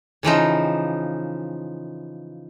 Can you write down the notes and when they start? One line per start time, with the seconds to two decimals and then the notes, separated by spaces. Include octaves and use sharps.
0.23 C#3 E3 F3 D#4